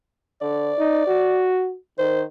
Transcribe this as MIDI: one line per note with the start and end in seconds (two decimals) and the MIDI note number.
0.42 0.73 50
0.42 1.49 74
0.79 1.05 63
1.07 1.76 66
1.99 2.24 51
1.99 2.23 72